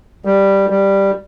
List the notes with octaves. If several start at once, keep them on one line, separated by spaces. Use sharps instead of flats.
G3
G3